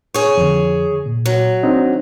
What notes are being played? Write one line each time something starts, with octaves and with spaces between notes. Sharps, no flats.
G#4 C#5
F2 D3
A#2
F#3
C4 D4 D#4